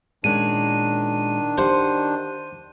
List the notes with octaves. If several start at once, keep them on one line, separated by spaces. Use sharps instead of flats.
A#2 D#3 G#3 C#4 D4 D#7
G4 C5 F5 F#5